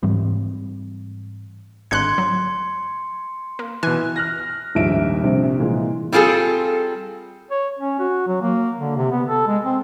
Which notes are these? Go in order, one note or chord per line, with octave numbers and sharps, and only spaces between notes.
G#2 E3 G3 C4
G#1 D3 C6 F#6 G#6 C#7
F#3
A#3
B2 E3 G#5 F#6
F6 F#6 A#6
D#1 A#1 G#2 E5 D7
A#1 C3 G3
A#2 E3 G#3
G3 C4 F4 G#4 A4
C#5
C#4
F#4
F#3
A#3
D3
C3
B3
A4
G#3
C4